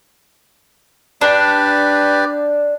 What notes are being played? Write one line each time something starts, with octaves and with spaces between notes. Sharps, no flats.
D4 G4 B4 D5